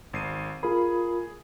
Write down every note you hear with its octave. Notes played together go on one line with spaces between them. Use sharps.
G#1 C7 D#7
F4 G#4 A#4 B5